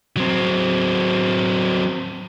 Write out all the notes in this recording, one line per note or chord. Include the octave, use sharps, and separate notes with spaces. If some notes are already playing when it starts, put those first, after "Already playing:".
F#3 C4